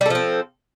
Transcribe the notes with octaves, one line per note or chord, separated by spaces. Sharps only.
F3 G3 C4 A4